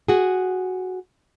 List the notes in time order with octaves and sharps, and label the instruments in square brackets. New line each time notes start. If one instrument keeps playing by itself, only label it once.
[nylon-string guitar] F#4 G#4